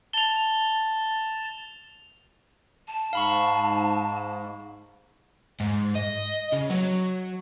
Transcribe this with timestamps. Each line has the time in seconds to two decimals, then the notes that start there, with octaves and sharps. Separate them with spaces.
0.13 A5 F7 G7
2.88 A5
3.13 G#2 F5 B5 C#6
5.60 G#2
5.95 D#5
6.52 C#3
6.69 F#3